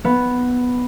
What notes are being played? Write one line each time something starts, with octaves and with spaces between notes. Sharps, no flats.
B3